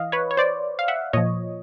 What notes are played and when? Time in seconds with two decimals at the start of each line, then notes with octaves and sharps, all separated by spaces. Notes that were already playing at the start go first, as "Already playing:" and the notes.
Already playing: E3 D#5 F5
0.12 B4 C#5
0.31 C#5
0.37 C5 D5
0.79 F5
0.88 E5 F#5
1.13 A#2 F3 C#5 D#5